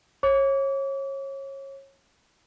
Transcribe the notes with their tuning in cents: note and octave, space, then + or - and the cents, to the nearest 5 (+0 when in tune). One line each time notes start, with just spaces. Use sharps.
C#5 -25 D6 -40